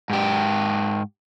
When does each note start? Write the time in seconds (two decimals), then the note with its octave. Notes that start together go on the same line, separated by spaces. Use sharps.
0.10 G#2 G4